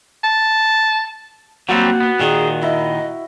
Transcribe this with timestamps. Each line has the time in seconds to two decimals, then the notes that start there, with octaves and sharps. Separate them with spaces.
0.23 A5
1.69 F#3 G3 A#3 C4 F#4 F#5
2.00 B3
2.20 A#2 D#3 G#4
2.63 E4 D#5